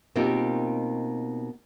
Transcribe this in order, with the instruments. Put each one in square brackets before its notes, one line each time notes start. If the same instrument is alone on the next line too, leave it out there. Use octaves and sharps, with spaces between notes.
[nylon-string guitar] B2 A#3 C4 D#4 F4 G4